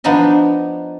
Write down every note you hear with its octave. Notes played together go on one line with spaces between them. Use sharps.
F3 B3 D4 D#4 D#5